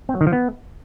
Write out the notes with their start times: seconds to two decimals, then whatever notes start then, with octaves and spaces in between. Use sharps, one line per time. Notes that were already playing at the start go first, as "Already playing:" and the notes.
0.09 C4
0.15 F#3
0.21 D#3
0.27 F3
0.33 B3